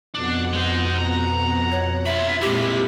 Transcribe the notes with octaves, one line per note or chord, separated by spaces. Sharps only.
F2 B2 D4 F#5
G#3 D#4
A#5
C#5
F4 E5 B5 C6 G#6 A6
A#2 G#3 C4 E4 G4 B6